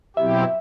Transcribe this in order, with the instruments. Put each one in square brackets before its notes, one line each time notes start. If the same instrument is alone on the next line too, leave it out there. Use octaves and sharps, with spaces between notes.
[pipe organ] B2 F#3 C4 E4 G4 [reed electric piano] E5